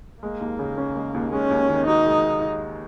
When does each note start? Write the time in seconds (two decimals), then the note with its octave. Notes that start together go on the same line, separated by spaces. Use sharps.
0.22 G#3 A#3
0.41 D#2
0.59 C#3
0.78 C#4
0.96 G#3
1.14 D#2
1.33 G#3 C#4
1.51 D#2
1.69 D#3
1.87 D#4 F#4
2.06 G#3